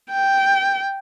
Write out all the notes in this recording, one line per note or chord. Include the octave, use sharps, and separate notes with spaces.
G5